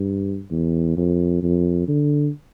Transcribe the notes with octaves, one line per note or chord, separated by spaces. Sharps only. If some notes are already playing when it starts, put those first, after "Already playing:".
Already playing: G2
E2
F2
F2
D3